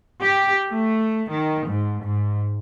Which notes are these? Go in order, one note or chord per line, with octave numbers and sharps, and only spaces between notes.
G4
A3
D#3
G#2
G#2